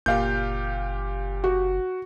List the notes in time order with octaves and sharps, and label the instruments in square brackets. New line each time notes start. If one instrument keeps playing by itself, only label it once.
[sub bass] F#1 [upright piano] A#2 F5 [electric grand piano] G4 G6
[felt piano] F#4